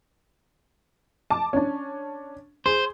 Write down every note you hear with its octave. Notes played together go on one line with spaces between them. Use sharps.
A5 D6
C#4 D4
G#4 C5